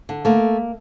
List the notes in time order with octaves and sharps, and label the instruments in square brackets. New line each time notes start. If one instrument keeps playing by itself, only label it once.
[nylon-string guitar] D3
A3 A#3